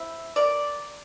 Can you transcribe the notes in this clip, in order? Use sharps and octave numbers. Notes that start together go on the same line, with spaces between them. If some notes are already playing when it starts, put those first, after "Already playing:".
Already playing: C4 E4
A#4 D5